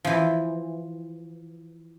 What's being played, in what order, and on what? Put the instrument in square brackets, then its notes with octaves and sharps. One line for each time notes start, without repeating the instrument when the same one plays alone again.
[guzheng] E3 F3